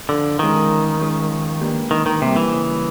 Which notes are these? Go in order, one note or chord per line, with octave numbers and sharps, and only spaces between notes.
D3 F3
D#3 G#3 C#4 F4 A#4
E3
G#3 C#4 F4
F3
A#3 D4 G4 B4
D#3 E3
D#3
C3 G3 A#3
E3
C#3